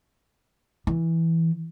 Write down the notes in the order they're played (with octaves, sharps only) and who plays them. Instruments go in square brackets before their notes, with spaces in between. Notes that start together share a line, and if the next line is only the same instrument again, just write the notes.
[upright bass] E3